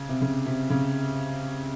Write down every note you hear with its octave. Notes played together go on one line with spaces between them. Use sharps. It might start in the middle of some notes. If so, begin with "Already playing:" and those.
Already playing: C#3
C3
C#3
C3
C#3